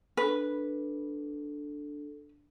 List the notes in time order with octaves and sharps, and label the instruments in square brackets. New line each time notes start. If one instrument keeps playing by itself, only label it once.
[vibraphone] D4 A4 [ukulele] B4